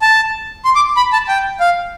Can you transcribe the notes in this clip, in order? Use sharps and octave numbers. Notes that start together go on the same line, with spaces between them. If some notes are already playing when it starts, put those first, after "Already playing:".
A5
C6
D6
B5
A5
G5
F5